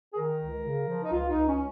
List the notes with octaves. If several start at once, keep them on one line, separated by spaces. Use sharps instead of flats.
G#4
D#3 A#4
C#2
C#3
F3
D#4
C#2 F4
D#4
C#2
C#4